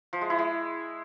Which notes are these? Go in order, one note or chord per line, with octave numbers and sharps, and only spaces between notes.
F3
G#3
E4
G#3